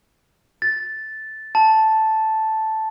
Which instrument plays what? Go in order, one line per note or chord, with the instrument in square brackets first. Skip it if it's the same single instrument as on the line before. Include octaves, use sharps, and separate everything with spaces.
[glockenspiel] A6
A5